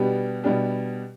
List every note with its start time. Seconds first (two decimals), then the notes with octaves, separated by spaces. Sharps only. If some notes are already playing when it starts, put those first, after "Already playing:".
Already playing: B2 G3 B3 D4 G4
0.44 B2 G3 B3 D4 G4